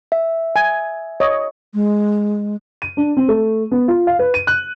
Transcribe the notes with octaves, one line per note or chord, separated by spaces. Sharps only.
E5
G#5
C#5 D#5
G#3
D#7
D4
C4
A3
B3
F4
F5
B4
D#7
F#6